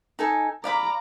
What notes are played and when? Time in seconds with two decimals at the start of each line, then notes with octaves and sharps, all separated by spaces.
0.19 D#4 A4 G#5
0.64 D5 F5 A#5 B5 D6